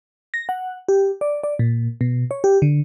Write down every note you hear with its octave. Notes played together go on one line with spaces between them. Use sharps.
A#6
F#5
G4
D5
D5
A#2
B2
C#5
G4
D3